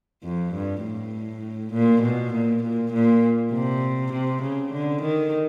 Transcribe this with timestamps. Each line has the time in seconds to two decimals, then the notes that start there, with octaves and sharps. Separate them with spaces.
0.23 F2
0.53 G2
0.83 A2
1.73 A#2
2.02 B2
2.33 A#2
2.63 A#2
2.93 A#2
3.52 C3
4.12 C3
4.42 C#3
4.72 D3
5.01 D#3